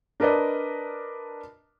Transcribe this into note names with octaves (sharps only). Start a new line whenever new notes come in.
D4 A#4 B4 D5 D#5